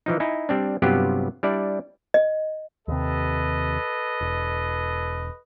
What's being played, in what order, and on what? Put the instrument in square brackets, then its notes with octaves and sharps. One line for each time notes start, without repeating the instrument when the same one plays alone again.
[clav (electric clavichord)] E3 F3 D#4
D#4 E4 G#5
G3 C4 D4
G2 C3 F#3 B3 F4 G4
G3 D4 E4 D5
[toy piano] D#5
[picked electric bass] D#2 C3 [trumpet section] A4 B4 D#5
[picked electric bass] E1